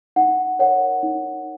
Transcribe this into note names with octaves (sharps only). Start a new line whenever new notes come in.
D#4 F#5
A#4 C#5 F#5
D#4